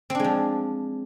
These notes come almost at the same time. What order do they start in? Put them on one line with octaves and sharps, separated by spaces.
C4 D4 G#3 F3